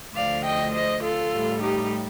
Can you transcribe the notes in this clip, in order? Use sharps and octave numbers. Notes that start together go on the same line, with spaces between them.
D2 D3 F3 D5 F5
D#5 G5
C5 D#5
F4 A4
A2 G3
D#4 G4